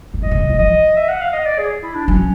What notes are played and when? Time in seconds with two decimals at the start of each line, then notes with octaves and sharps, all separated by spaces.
0.14 D#3
0.22 D3 D#5
0.31 C#3
0.41 D3
0.49 E3
0.59 F3 D#5
0.96 E5
1.08 F#5
1.21 F5
1.33 D#5
1.46 D5
1.58 G#4
1.83 E4
1.95 D4
2.07 F#3 C#4